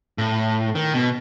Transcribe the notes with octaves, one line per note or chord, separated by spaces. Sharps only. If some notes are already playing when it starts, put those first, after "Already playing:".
A2
D#3
B2